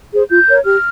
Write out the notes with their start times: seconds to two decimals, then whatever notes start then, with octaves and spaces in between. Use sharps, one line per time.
0.11 G#4 C5
0.30 F4 G6
0.48 A#4 C#5
0.65 G4 F6